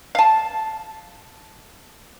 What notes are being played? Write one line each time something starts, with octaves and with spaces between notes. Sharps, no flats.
F5 A5